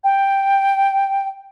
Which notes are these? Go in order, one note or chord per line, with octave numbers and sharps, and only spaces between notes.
G5